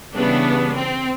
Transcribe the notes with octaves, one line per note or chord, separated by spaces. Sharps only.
C#3 E3 G3 B3 D4
C4